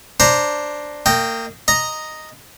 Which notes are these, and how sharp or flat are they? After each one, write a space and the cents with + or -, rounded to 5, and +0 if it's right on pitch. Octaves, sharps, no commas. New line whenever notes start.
D4 +0 C5 +0 A#5 +0
A#3 -30 D#5 -5 G5 +0
D#5 +0 A#5 +0